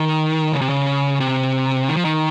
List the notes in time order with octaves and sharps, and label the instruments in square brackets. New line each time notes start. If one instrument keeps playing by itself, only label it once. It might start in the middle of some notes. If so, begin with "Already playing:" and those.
Already playing: [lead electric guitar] D#3
C#3
C3
C#3
C3
D#3
F3
D#3